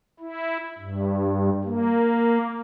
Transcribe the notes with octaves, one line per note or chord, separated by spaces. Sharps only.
E4
G2
A#3